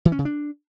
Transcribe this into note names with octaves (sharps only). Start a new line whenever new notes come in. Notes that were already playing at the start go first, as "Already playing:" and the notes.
E3
C#4
C#3
D4